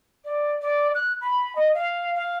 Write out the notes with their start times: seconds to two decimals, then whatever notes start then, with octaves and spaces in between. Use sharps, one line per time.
0.24 D5
0.61 D5
0.94 F#6
1.21 B5
1.55 D#5
1.74 F5
2.14 F5